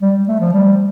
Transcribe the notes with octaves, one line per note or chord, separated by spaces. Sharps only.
G3
A3
F3
G3